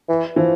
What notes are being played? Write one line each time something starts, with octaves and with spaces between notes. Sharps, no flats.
E3
E3 F3